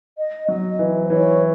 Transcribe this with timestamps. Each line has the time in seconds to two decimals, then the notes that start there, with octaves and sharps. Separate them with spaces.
0.18 D#5
0.48 F#3 D#5
0.79 E3
1.04 C5
1.10 E3 C#5